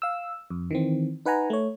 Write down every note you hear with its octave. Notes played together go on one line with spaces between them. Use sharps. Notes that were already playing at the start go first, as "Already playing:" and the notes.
F5 E6
F2
D#3 E3 C4
D#4 B4 F#5 G#5 A#5
A3 C#5